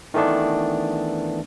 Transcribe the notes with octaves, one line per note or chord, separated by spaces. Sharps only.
D#3 E3 A3 B3 D4